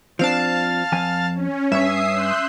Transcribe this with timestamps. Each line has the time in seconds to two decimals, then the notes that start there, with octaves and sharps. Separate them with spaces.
0.19 F3 C4 D4 F5 A5
0.92 F2 F3 G#5
1.34 C#4
1.72 G2 C#5 E5 D#6 C7
2.13 C6 F#6 G6